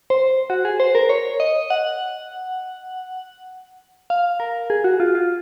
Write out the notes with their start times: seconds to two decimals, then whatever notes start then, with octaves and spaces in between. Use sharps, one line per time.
0.10 C5
0.50 F#4
0.65 G#4
0.80 C5
0.95 A#4
1.09 C#5
1.40 D#5
1.70 F#5
4.10 F5
4.40 A#4
4.70 G#4
4.84 F#4
5.00 F4
5.15 F4